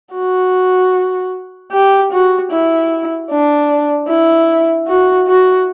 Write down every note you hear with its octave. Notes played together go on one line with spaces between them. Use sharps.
F#4
G4
F#4
E4
D4
E4
F#4
F#4